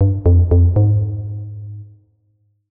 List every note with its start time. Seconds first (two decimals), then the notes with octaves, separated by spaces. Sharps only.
0.01 G2
0.26 F2
0.51 F2
0.76 G#2